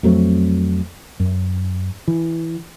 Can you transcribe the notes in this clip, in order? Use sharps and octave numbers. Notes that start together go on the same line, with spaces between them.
F2 F#3 A3 C4
F#2
E3